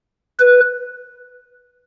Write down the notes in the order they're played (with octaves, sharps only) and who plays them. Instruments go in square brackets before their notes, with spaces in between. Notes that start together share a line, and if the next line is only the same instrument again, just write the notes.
[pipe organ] B4